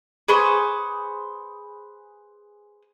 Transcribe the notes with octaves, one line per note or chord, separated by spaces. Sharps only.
G#4 B4 C5 C#6